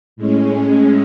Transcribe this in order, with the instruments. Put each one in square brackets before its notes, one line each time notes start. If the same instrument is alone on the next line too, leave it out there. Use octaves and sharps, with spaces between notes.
[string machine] A2 G#3 C#4